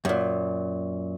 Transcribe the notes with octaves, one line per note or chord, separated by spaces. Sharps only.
F#2 A#2